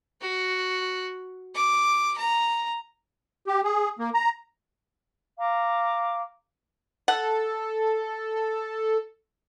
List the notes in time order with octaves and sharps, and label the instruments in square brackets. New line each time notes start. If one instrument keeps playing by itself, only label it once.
[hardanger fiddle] F#4
D6
A#5
[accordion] G4
G#4
A#3
A#5
[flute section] F5 A#5 D6
[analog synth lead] A4 [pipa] F#5